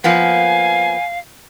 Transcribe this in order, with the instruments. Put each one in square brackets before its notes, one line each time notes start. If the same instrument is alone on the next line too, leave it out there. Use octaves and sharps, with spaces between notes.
[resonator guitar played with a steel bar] F3 A#3 B3 [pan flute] F5 [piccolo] G#5